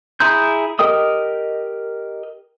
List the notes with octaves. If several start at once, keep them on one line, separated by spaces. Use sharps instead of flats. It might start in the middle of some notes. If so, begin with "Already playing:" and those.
E4 G#4 A#5 C6 G6
G4 A#4 D#5 G5 D#6